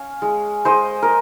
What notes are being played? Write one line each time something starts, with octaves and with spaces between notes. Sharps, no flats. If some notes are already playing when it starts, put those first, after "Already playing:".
Already playing: C#4 C#5 F5
G#3
G#3 C5 D#5
A#4